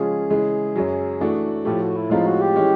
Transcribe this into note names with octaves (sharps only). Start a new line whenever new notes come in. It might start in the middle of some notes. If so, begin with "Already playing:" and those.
Already playing: C#3 F3 G#3 C#4 F4 G#4
C#3 E3 G#3
F#2 C#3 F#3
E3 A3 D4 F#4
A2 F3 A3 G4
F#4
E4
A2 F3 G#3 C4 D#4 F4
F#4
G4
E3 G#3 C#4